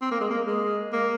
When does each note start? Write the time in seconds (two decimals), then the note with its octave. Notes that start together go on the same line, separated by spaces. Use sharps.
0.02 C4
0.11 A#3
0.21 G#3
0.30 A#3
0.47 G#3
0.93 A#3